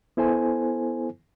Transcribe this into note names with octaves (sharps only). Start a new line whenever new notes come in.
B3 E4 A4 C5 G#5